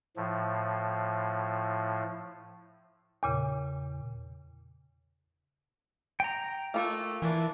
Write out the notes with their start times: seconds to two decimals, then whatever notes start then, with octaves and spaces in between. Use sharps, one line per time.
0.16 A2 F3
3.23 E2 A#2 C#3
6.20 G5 A#5
6.74 A3 A#3 F4
7.22 A#2 E3 D4 A#4